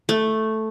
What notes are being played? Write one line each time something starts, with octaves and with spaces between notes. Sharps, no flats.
A3